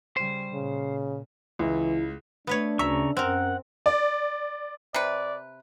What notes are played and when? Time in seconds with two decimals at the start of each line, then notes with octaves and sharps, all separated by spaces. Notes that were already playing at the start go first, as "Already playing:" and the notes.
0.17 C#3 G3 C5
0.53 A#2 C#3
1.59 C#2 E3 E4
2.47 A3 B3 D4 B4 C#5
2.79 D2 C#3 E5 A#5 C#6
3.17 F#2 C4 A#4 F#5
3.86 D5
4.94 C3 B4 D5